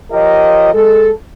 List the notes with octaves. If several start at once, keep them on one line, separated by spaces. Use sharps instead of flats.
F3 F4 G4 A#4 C#5 D#5
G#3 A4